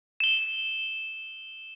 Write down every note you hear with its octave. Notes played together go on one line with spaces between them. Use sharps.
E7 G7